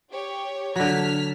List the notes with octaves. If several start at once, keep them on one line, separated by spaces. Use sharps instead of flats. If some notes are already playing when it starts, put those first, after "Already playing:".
G4 C#5
D3 F#3 A5 F6 B6